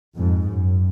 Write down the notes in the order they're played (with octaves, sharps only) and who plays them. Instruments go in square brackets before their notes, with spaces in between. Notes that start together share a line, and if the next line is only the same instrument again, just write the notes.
[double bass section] F2 G#2
F#2